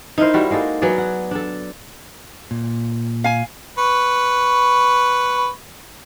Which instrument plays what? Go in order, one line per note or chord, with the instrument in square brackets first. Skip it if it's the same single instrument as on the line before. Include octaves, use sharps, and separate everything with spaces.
[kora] D#4 E4 A#4 C5
G3 E4 F#4
G#3 A#3 D#4 A4
F#3 B3 G#4 D5
F#5
D4 A4
[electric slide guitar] A#2
[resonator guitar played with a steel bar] F5 G#5
[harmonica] B4 C#6